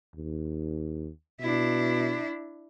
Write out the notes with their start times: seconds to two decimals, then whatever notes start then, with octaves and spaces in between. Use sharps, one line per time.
0.15 D#2
1.40 B2 D4 E4